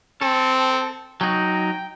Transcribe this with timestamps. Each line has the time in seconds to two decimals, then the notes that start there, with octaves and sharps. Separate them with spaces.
0.21 C4 A4
1.21 F#3 D#4 G5